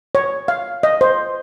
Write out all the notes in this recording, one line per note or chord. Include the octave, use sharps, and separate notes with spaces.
C#5
F5
D#5
C5